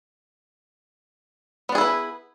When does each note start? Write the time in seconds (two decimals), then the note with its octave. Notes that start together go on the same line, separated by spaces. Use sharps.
1.69 B3
1.72 D4
1.75 G#4
1.78 E4
1.81 B4